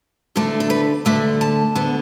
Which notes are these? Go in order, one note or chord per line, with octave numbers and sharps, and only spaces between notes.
E2 D3 A3 D4 A4
A4
B4
D2 D3 A3 D4 E5
A5
D2 D3 B3